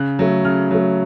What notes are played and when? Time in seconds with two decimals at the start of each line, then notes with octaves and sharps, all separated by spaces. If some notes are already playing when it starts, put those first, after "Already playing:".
Already playing: C#3 F#6
0.19 F#3 A3
0.45 C#3 F6
0.71 F#3 A3